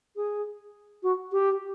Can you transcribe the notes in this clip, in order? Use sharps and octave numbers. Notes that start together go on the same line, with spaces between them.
G#4
F#4
G4